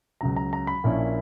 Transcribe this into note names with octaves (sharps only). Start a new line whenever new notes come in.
C#2 C#3 F#3 A#5
A#5
A#5
B5
A#1 A#2 A#3 C#4 E4